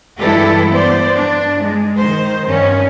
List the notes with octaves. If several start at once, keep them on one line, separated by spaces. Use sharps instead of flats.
G2 E3 G#3 E4 G4 A4
B3 C5 D5
G2 D4
G#3
D#3 C5
G2 D#3 C#4